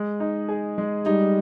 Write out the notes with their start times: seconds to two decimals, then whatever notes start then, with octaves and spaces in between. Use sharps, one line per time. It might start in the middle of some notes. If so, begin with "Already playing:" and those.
Already playing: G#3
0.20 D#4
0.48 G#4
0.78 G#3
1.06 G3 D#4